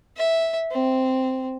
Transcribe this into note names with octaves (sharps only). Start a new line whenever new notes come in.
E5
C4